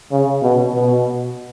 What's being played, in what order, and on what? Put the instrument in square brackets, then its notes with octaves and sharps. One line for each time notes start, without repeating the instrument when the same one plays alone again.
[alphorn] C#3
B2
B2